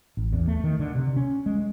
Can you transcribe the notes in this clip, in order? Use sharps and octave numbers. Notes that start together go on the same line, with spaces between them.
A1
E2
A3
D#3
D3
C3
C#4
G#3